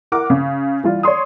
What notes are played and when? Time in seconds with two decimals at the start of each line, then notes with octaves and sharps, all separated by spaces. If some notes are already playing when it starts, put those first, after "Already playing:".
0.12 E4 A#4 F#5 D6
0.30 C#3
0.84 E3 G3 F4
1.03 C#5 D5 C6 D#6